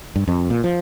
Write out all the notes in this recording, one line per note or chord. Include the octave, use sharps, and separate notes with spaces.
G2
F2
A#2
F3